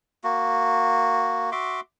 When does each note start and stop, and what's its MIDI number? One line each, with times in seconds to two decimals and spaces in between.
0.24 1.51 58
0.24 1.51 66
1.52 1.80 66
1.52 1.80 76
1.52 1.80 84
1.52 1.80 86